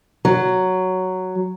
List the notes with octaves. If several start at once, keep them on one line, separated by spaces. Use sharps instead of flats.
F#3